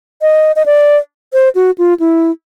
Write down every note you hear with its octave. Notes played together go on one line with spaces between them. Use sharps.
D#5
D#5
D5
C5
F#4
F4
E4